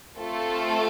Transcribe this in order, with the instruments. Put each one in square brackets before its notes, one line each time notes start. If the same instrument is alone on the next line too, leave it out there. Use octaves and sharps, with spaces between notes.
[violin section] A3 C4 F4 A4